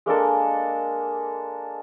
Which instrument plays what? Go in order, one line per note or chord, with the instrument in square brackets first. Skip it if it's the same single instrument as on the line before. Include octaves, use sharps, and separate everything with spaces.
[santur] G#3 A#3 D4 A4